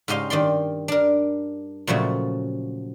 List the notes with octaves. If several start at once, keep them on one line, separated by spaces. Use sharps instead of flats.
G#2 C#3 G4 D#5 F5 C6
G2 D#3 G4 D5 C6
D4 A#4
A#2 C#3 F3 F#3 A3